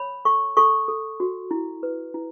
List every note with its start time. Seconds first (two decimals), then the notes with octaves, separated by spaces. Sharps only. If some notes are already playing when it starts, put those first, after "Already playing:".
Already playing: C#5 B5
0.25 A4 C#6
0.57 A4 C#6
0.88 A4
1.20 F#4
1.51 E4
1.83 B4
2.14 E4